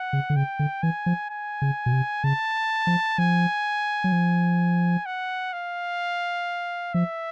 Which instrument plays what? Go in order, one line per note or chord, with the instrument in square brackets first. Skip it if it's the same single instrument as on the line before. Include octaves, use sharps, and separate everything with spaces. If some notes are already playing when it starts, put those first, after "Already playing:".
Already playing: [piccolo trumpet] F#5
[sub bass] C#3
D3
[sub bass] C#3 [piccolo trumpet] G5
[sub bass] D3
[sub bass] E3 [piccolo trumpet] G#5
[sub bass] F3
[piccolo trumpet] G#5
[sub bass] C#3
B2
C3
[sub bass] C#3 [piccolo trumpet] A5
[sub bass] F3
[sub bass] F3 [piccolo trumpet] G#5
[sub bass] F#3
F3
[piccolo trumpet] F#5
F5
[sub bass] F3 [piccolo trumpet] E5